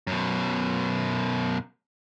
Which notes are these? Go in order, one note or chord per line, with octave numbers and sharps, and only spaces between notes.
F#2 B2